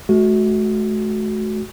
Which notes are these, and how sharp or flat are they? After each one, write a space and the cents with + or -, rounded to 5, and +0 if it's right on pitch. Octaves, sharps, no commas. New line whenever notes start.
A3 -40 F#4 +0